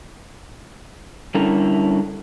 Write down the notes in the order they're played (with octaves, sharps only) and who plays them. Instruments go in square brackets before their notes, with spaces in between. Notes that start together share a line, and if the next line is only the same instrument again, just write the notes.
[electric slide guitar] D3 G3 C#4 E4 A4 A#4